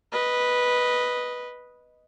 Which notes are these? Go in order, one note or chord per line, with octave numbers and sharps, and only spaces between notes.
B4 D#5